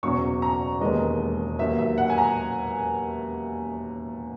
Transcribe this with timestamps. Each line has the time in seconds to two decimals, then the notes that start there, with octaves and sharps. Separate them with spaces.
0.03 F#1 E2 B2 F#3 C#6
0.42 A#5
0.80 E1 D#2 D#3 G#3 B3 D#5
1.59 D#2 D#3 F#3 B3 E5
1.78 E5
1.98 F#5
2.10 G#5
2.18 A#5